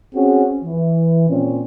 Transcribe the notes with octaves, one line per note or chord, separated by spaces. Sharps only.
C4 C#4 F#4 G#4
E3
A#2 C4 C#4